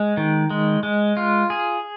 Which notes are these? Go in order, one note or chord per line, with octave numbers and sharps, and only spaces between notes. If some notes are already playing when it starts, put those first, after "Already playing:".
Already playing: G#3
D#3
G#3
G#3
F4
G#4